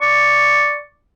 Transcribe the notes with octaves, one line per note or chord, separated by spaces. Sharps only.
D5 C#6